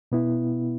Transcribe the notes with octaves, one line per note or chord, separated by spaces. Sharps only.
B2 B3 E4